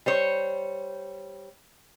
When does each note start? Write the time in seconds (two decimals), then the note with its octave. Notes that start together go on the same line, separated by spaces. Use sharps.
0.06 G3 C5 C#5